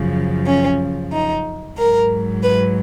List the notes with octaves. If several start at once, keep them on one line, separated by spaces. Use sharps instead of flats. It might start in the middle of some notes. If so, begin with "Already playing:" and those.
Already playing: F#2 C#3 F3
C#4
D#4
G#2 F#3 A#4
B4